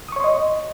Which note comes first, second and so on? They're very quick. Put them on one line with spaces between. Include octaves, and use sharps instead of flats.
D#6 C#6 C#5 C6 D#5